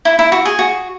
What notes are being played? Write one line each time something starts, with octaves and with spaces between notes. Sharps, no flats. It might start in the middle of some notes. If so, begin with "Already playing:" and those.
E4
E4
F#4
G#4
F#4